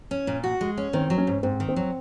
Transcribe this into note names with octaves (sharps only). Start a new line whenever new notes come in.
C#4
A#2
F#4
G#3
C#4
D#3 C4
F#3
C#4
G#2
G#2 C4
D#3
C4
F#3